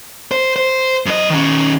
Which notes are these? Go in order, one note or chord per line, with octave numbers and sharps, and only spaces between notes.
C5
C5
F#2 D#5
D#3 C#4